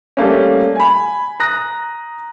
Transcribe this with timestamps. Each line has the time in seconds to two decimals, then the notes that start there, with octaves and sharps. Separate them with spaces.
0.17 G3 A3 A#3 C#4
0.76 G#5 B5
1.40 A#5 D#6 F#6 A#6